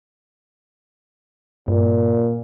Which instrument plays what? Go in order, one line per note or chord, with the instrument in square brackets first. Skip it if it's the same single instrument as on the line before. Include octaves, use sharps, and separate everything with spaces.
[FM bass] G2 [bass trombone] A#2